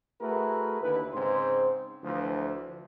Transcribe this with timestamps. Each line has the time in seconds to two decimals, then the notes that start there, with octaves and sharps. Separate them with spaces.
0.20 A3 E4 F#4 G#4 A#4 B4
0.82 D#2 D3 E4 B4
1.12 G#2 C#3 C4 C5
2.04 D2 E3 F3